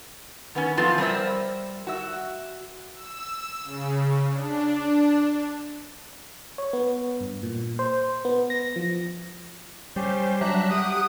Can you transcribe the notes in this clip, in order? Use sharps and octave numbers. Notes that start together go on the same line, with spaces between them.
D#3 B3 C#4
F3 A3 B3 C4 F4
G3 A#4 C5 E5
F#4 E5
E6
C#3
D4
C#5
B3
G2
A#2
C5
B3
A#6
F3
G3 C#4 G4 C5
F#3 D4 E5 A#5 F#6
G4 F#5 D#6 F#6